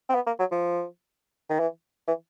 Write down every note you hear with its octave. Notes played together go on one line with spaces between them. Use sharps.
C4
B3
A#3
F#3
F3
D#3
E3
E3